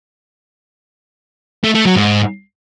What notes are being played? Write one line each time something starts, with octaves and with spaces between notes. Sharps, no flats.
A3
A3
F#3
G#2